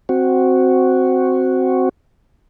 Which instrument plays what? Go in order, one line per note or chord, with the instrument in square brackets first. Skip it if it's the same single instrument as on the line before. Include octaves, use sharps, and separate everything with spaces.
[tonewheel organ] C4 F#4